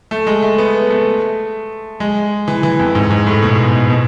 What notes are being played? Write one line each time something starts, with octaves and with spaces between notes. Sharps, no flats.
A3
G#3
A3
B3
A3
G#3
E3
E3
F2
G#2
G#2
A2
B2
B2